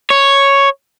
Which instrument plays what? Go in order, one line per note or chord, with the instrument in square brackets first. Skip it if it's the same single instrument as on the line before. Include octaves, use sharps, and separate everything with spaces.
[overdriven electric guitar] C#5